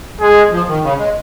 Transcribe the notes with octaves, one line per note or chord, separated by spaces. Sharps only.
G#3 G#4
F3
D#3
C#3
G#3